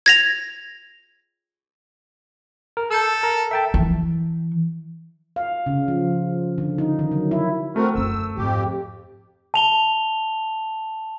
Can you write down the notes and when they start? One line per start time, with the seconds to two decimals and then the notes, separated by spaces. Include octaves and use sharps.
0.06 G#6 A#6 F7
2.77 A#4
2.91 A4 E6 G6
3.23 A#4 A#5
3.51 E5 G5 A5
3.74 E3
5.36 F5
5.66 C#3
5.88 F3
6.58 D3
6.78 D#4
6.99 D#3
7.12 F#3
7.31 E4
7.76 A3 C4 F#4 A#4
7.95 F#2 E4 E6
8.37 F2 G#2 F3 G4
9.54 A5 F7 G7